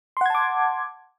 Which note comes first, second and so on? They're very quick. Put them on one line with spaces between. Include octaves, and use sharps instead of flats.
C6 F#5 G#6 A5 D6